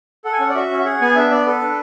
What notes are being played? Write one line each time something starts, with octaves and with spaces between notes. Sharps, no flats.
A4 F#5
G#5
C#4 F#5
D5
F#4 E5
C#4
E5
G#4 F#5
B3 G#5
D4 E5
B3 D5
A4 B4
D4